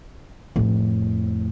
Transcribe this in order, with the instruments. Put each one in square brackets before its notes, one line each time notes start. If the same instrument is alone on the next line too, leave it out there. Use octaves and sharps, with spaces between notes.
[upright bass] F2 A2